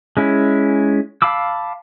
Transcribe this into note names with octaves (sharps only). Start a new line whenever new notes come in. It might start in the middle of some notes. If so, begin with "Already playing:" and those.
G#3 C#4 E4
F5 A5 B5 D6 E6